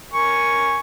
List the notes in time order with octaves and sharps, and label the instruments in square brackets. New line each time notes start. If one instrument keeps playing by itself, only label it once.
[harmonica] A#4 G#5 C#6